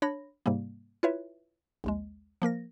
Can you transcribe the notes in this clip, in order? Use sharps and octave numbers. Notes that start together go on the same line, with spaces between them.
D4 C#5 B5 A#6
G#2 C3 G3 A#3
E4 F4 B4 C#5 E5
A#1 D#2 G#3
F3 A#3 A#4 A#6